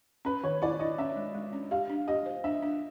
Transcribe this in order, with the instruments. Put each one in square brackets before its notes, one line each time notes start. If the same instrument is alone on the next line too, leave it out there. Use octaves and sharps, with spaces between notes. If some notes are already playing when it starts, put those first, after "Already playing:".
[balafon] C#4 [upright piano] B4
[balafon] D#3 [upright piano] C#5
[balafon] E4 [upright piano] D5
[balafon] E4 [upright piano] D#5
[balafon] C#4 [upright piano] E5
[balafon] G#3
G#3
C#4
[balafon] G4 [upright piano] F5
[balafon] D4
[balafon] G4 [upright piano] D#5
[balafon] C5
[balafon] D4 [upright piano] E5
[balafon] D4